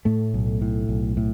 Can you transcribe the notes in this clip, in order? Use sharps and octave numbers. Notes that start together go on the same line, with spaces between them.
A2 A3
B1
A2
B1
A2